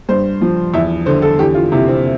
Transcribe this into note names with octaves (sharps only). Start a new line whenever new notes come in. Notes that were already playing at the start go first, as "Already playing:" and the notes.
G2 C5
F3
E2 E5
D3 C5
A4
E2 G4
F4
C3 E4
C4